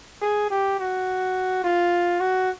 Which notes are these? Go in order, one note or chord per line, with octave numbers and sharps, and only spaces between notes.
G#4
G4
F#4
F4
F#4